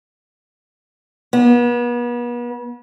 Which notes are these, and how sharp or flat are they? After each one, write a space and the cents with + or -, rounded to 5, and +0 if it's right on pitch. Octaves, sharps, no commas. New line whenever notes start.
B3 -40